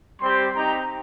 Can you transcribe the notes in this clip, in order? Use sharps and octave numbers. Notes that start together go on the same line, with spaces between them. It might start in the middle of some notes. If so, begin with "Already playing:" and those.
G3 C4 G4 C6
C4 D#4 G4 A#5